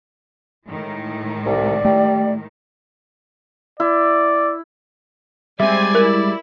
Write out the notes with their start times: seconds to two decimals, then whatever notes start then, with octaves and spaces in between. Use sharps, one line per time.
0.66 A2 D#3 G#3
1.46 C2 D5
1.85 G3 A3
3.80 E4 D5
5.60 G3 G#3 C4 D5 E5 G#5
5.95 E4 A#4